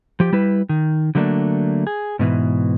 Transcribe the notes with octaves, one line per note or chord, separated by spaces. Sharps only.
F3 G4
G3 E4 B4
D#3
D3 F#3 A3 A#3 D4
G#4
G#2 B2 E3